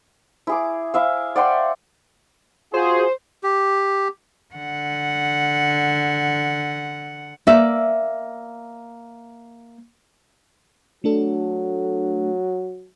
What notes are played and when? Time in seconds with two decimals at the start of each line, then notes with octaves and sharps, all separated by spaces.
0.47 E4 G#4 D6
0.94 E4 E5 F5
1.36 D5 F#5 G5 C6
2.74 F4 F#4 G#4 C5
3.43 G4
4.55 D3 F#5
7.47 A#3 D5 E5
11.04 F#3 A3 D4 A4